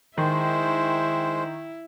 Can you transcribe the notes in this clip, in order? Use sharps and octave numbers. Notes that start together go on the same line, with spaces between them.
D#3 G#3 E4 C5